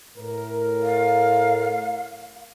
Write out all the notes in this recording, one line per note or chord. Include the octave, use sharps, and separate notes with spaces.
A2 A#4
F5